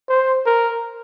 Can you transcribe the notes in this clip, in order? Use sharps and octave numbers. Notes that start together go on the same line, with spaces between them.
C5
A#4